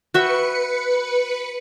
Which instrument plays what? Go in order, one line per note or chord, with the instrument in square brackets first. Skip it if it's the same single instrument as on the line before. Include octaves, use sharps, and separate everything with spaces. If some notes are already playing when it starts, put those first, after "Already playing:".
[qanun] F#4 E5 G5 [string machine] B4 C#7